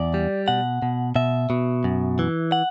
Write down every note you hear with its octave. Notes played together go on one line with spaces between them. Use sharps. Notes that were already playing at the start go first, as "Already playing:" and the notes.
Already playing: E2 D5
G3
B2 F#5
B2
B2 E5
B2
F#2
E3
F#5